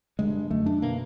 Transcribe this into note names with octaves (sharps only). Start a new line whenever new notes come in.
G2 D3 G#3
F#2 D3 A3
D4
B2 A#3